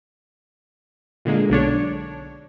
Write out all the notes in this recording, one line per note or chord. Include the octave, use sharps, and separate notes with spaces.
A#2 D3 G#3 A#3
B1 D3 D4 C#5